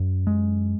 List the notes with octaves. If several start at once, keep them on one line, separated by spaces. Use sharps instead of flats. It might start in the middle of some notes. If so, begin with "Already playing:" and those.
Already playing: F#2
G#3